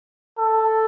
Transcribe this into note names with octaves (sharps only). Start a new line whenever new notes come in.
A4